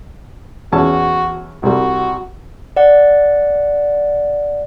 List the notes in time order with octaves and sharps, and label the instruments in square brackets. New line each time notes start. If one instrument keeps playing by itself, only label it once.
[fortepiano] E2 C#4 A5 [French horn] F#4
[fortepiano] C2 G3 [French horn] F#4
[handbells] D5 F#5